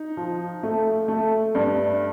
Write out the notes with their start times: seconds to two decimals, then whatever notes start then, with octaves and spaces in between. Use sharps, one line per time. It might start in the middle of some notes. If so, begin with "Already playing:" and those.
Already playing: D#4
0.17 F3
0.63 A3
1.08 A3
1.55 G2